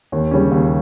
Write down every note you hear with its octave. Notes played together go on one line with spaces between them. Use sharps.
D#2
C#3 G3 C#4
D#2